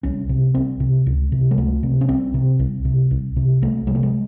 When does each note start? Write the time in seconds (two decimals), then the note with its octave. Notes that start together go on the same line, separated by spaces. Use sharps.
0.03 C2 C#4
0.29 C3
0.54 C2 C4
0.80 C3
1.06 C#2
1.32 C3
1.51 G#3
1.57 C#2 A3
1.83 C3
2.01 C#4
2.08 C2 C4
2.34 C3
2.59 C2
2.85 C3
3.11 C2
3.36 C3
3.61 C2 A3
3.87 C3 G#3
3.95 A3
4.03 G#3